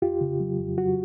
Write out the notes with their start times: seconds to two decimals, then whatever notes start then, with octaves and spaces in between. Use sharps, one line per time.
0.02 F2 F4 G4
0.21 C#3
0.40 F#3
0.59 F2
0.77 F#3 F#4